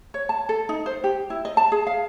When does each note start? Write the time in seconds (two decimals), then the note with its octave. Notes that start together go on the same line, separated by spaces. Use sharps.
0.14 C#5
0.29 A5
0.49 A4
0.69 D#4
0.86 C5
1.04 G4
1.30 E4
1.45 D#5
1.57 A5
1.72 G#4
1.87 F5